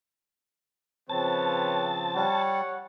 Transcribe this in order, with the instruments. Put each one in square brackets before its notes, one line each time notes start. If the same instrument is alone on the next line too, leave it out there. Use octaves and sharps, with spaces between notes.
[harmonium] C#3 F3 C4 [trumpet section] B4 C#5 [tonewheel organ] A5
[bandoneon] G3 [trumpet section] C#5 F#5